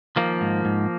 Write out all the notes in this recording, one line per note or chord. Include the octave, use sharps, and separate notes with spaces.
D#3 F3 A#3
G#2
G#2